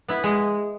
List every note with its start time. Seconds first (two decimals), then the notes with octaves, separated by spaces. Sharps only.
0.08 B3 E4
0.24 G#3